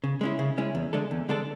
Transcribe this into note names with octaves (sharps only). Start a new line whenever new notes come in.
C#3
G#3 C#4 E4
C#3
G#3 C#4 E4
E2
D3 G#3 D4 A4
E2
D3 G#3 D4 A4